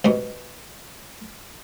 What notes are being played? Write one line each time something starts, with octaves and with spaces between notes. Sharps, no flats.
C2 G#2 B2